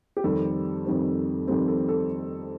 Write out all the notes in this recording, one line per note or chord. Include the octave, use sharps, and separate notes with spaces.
G4
F2 D#3 G3 C4 A4
F2 D#3 G3 C4
F2 D#3 G3 C4 A4
A4
A4